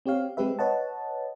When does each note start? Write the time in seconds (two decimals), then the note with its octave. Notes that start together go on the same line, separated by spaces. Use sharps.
0.06 C4 G4 C#5 F5
0.37 G#3 C4 G4 B4 E5
0.59 B4 C#5 D#5 F#5 A5